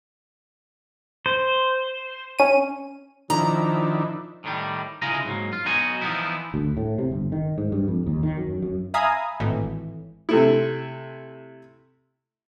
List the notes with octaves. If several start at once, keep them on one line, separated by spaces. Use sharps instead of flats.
C5
C#4 D#7
D#3 F3 D4 E4 A#5
A2 D#3 G3
C#3 E4 F4 G#4 D#5 A#5
G#2 F#3 A#3
F4
B1 B2 D#4 F#4 G#5
E3 F3 A3 B3 D#4 E4
D2
A2
C3
G1
D#3
G#2
G2
F2
D#2
D#3
F#2
F#2
E5 F5 G#5 A#5 B5 D#6
G#1 A2 E3
C3 A3 E4